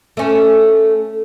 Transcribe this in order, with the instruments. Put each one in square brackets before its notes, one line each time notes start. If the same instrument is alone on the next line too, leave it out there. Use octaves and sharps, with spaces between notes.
[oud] A3 C#4